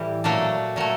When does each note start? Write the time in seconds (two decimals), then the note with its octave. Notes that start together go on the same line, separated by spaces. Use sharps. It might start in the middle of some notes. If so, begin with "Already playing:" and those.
Already playing: A2 E3 G3
0.24 A#2 F#3 A3 D4
0.76 A#2 F#3 A3